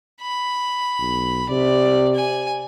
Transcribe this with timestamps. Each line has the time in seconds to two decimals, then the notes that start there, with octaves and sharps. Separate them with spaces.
0.22 B5
0.99 B1
1.50 C3 D5
2.15 G#5